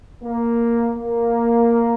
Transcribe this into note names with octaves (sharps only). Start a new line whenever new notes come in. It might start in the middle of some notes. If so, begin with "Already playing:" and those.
A#3
A#3